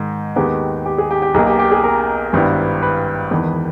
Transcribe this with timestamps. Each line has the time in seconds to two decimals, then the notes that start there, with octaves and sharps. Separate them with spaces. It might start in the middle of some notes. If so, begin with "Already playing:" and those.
Already playing: G#2 D#3
0.36 D#2 D#3 G#3 B3 G4
0.86 G4
0.98 G#4
1.11 G4
1.22 G4
1.34 B1 B2 A#3 G#4
1.47 G4
1.59 G4
1.72 G#4
1.84 A#4
2.33 G#1 G2 G3 B3 E4
2.82 B4
3.31 E1 E2 D#3